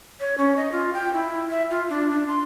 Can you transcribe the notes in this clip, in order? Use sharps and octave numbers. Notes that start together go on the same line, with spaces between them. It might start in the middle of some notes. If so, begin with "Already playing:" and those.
C#5
C#4
D#5
F4
G5
E4
E5
F4
D4
D4
C6